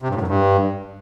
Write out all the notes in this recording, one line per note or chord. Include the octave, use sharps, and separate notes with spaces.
C3
G2
A2
F#2
G2